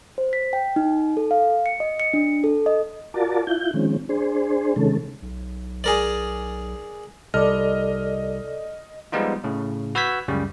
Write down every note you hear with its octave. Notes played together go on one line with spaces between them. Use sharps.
C5
B6
G5
D#4
A4
F5
C#7
D#5
C#7
D4
A4
D#5
F4 F#4 A#4 D5 A5
E4 F4 G6
D#3 F3 G#3 C4 C#4
D4 G#4 C5
C3 D#3 G#3 C#4 A4
B1
G#4 A#4 D5
C2 A4 D5 D#5 F6
F3 G3 G#3 B3 D#4 F4
A2 C#3
F#4 B4 E6 G6 G#6 B6
C#2 F#2 C#3 G3